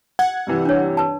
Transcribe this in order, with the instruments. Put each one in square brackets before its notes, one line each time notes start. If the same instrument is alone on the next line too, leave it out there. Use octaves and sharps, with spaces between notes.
[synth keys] F#5 [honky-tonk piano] G#6
[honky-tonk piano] G2 C3 E3
[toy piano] D4 C#5
B4 A5